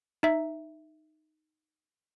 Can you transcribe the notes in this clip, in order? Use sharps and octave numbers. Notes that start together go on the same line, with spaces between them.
D#4 E5